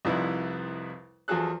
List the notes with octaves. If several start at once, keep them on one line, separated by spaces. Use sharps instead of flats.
C2 F2 G3 D#4 E4 B4
E2 F3 F#3 G#4 A4 F#6